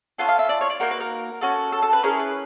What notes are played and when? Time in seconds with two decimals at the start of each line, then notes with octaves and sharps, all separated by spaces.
0.18 C#4 F4 A4 F#5
0.29 F5
0.39 E5
0.49 D5
0.61 C#5
0.70 D5
0.80 A#3 D#4 F#4 A#4
0.91 B4
1.00 A#4
1.41 C#4 F#4 A4
1.72 A4
1.83 A4
1.93 B4
2.03 C#4 E4 G#4 A#4
2.19 B4